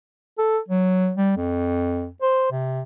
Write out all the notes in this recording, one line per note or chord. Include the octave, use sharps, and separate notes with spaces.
A4
F#3
G3
F2
C5
C3